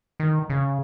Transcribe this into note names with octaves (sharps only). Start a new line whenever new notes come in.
D#3
C#3